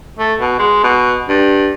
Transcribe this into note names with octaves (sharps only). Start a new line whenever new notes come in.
A3
B2
G#3
B2
G2